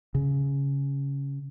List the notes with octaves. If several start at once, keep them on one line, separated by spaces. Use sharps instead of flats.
C#3